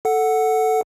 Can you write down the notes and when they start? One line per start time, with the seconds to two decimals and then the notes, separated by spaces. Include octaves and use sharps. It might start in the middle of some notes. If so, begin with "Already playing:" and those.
0.05 A4 F#5